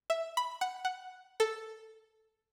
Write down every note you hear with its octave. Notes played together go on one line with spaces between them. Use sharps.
E5
B5
F#5
F#5
A4